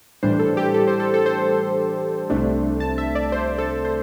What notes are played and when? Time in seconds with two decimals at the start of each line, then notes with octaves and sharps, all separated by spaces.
0.23 A2 E3 G3 D4 C5
0.39 A4
0.57 G4
0.74 A4
0.87 C5
1.00 A4
1.14 A4
1.26 C5
2.30 C2 C3 A3 D4
2.80 A5
2.98 E5
3.15 D5
3.32 C5
3.58 A4
3.85 C5